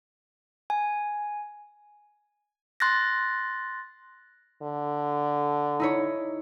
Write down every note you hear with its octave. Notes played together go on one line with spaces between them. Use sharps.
G#5
C6 F#6 A6 A#6
D3
D#4 E4 C#5